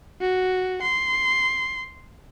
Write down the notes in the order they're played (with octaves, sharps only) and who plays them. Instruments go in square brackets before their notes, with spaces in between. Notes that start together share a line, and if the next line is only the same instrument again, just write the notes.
[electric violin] F#4
C6